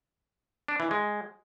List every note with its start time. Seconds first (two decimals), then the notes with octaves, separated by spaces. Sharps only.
0.68 D4
0.80 E3
0.91 G#3